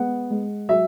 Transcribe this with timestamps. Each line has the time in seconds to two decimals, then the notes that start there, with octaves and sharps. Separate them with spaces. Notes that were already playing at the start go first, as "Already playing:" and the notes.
Already playing: G#3 B3 F#5
0.30 G#3
0.69 F#3 E5